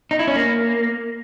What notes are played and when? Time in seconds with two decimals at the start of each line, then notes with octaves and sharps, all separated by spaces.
0.11 D#4
0.19 E4
0.27 C#4
0.36 A#3